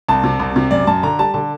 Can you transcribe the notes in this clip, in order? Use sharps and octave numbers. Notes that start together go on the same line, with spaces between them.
C2 A5
C3
C2
C3
F#2 D5
F#2 A5
D3 A#5
G3 A5
D3 A5